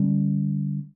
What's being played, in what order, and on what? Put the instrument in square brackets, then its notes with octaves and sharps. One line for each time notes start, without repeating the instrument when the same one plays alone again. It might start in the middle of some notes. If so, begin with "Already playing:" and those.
Already playing: [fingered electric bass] D3 G3 C#4